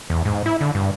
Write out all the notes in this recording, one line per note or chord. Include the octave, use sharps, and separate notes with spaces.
E2
G#2
E4
D3
G2